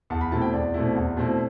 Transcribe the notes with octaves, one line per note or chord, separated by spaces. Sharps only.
E2 A5
B5
B2 A3 C4 E4 A5
G5
E2 D5
B2 A3 C4 E4
E2
B2 A3 C4 E4